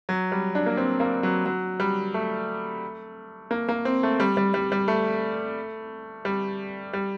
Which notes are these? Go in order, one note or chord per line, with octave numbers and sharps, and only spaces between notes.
F#3
G3
D4
A#3
C4
A#3
F#3
F#3
G3
A3
A#3
A#3
C4
A3
G3
G3
G3
G3
A3
G3
G3